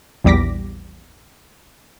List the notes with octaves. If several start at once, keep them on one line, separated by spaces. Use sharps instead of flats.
A#1 E2 G3 D6 A#6 B6